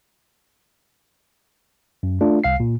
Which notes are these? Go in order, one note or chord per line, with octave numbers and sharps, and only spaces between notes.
F#2
A3 D4 F4
C2 F5 C7
A#2